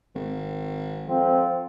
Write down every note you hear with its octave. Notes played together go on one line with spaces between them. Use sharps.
G#1
F2 F3 C4